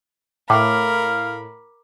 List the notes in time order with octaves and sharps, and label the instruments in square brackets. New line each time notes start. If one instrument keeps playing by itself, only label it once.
[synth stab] A2 [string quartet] A#4 B5 [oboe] F5 [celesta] D6